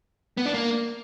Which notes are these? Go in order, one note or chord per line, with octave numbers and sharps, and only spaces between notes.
B3
D4
A#3